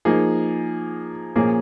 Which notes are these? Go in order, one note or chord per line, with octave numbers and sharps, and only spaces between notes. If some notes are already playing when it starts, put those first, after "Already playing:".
F3 A#3 D#4 G#4
A#2 F3 A#3 C#4 G#4